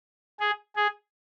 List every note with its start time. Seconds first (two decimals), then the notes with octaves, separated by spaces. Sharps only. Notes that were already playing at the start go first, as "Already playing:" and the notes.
0.40 G#4
0.76 G#4